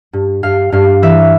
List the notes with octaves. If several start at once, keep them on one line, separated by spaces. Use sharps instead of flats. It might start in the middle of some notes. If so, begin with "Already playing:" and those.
G2
G2 F5
G2 F5
E3 E5